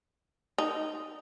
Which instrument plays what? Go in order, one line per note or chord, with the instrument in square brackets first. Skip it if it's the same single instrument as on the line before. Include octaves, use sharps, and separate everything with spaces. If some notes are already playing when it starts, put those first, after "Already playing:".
[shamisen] D#4